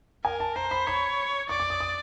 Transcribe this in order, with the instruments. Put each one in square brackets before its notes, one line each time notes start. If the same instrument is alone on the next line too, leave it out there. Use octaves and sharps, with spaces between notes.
[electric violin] A#4 [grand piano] G#5
[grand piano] A5
[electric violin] C5 [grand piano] A#5
[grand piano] B5
[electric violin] C#5 [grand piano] B5
[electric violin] D5 [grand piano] C#6
[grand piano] D6
D#6
D#6